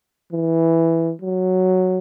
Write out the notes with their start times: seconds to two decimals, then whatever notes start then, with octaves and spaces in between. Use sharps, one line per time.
0.33 E3
1.22 F#3